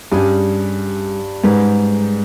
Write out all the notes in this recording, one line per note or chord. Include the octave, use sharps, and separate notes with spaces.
G2 G3 C#4 G#4
G#2 G3 C#4 G#4 B4